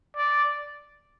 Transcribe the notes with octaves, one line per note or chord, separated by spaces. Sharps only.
D5